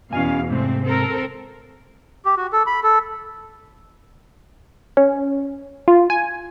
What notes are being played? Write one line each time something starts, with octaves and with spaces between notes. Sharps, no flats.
E2 B2 C#4 F5 G#5
G#2 C3 A3 C4
C4 A4 A#4
G4
F#4
A4
B5
A4
C#4
F4
G#5